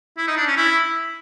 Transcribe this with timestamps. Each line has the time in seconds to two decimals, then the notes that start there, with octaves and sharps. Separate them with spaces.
0.17 E4
0.27 D#4
0.37 D4
0.47 C#4
0.57 E4